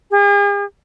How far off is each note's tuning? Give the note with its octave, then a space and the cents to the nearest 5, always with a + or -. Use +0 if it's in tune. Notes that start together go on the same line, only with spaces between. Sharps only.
G#4 -45